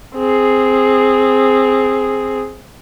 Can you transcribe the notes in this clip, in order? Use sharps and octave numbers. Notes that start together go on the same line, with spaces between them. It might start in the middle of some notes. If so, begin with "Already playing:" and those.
C4 G#4